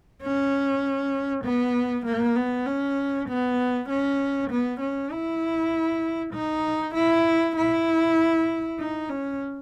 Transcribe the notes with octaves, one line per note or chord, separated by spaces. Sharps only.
C#4
B3
A#3
B3
C#4
B3
C#4
B3
C#4
E4
D#4
E4
E4
D#4
C#4